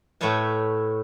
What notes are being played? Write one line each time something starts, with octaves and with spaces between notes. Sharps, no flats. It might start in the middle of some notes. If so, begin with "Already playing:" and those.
A2 A3 B4 C#5 E5 A5